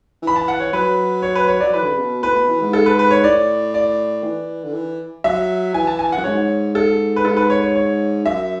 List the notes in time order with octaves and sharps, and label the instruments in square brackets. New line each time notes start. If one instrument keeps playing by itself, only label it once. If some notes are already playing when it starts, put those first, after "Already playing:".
[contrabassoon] E3
[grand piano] B5
A5
F#5
C#5
[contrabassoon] F#3 [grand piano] B4
[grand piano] C#5
B4
C#5
[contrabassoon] F#3 [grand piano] D5
[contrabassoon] E3 [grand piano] B4
[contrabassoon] D3
C#3
B2
[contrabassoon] A2 [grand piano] B4
[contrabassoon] B2
E3
G#2
[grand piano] A4
B4
B4
C#5
[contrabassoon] A2 [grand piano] D5
[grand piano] D5
[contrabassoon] E3
D3
E3
[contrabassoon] F#3 [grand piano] E5
[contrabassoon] E3 [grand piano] G#5
[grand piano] A5
G#5
[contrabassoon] F#2 [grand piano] F#5
[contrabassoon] G#2 [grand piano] C#5
[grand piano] A4
B4
[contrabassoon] G#2 [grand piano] A4
[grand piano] B4
C#5
C#5
C#5
[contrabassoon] F#2 [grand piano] E5